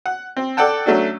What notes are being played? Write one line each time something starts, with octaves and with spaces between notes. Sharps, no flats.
F#5
C4
A4 D5 F#5 G5 A5
F#3 A3 C#4 D4 F#4